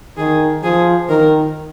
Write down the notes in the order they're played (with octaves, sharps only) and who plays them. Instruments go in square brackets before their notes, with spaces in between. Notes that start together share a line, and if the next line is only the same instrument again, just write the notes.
[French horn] D#3 [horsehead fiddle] G#4
[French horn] F3 [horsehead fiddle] G#4
[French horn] D#3 [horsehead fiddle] A#4